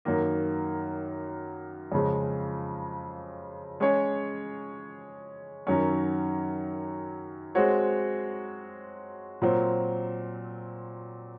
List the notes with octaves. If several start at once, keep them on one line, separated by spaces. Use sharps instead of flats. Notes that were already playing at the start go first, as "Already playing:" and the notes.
F#2 D#3 A#3
F2 C#3 G#3
G#3 C#4 G#4 C#5
F#2 D#3 F#3 C#4
G#3 C4 F#4 C#5
A#2 F#3 C4